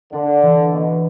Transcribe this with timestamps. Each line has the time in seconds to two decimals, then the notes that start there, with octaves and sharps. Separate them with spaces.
0.13 D3 D4
0.43 E3
0.72 B2 A#3